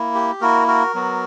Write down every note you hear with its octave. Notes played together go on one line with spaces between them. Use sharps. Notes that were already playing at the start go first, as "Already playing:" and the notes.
Already playing: A#3 E4
G4
A#3 E4 F#4 A#4
F#4 A#4
F#3 B3 F#4